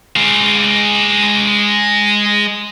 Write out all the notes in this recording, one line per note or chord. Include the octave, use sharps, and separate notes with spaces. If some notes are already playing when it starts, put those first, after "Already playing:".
G#3 F5